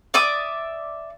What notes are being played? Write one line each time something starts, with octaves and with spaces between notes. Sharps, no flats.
D5 E5 D6 D#6